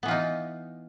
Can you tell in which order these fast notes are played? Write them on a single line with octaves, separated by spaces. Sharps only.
B3 E3 F4 D#4